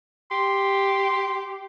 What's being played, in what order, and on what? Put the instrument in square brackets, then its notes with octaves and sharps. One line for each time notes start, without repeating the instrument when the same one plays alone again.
[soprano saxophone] G4 [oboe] C6